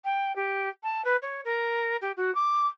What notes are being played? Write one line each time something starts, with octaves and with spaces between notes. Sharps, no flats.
G5
G4
A5
B4
C#5
A#4
G4
F#4
D6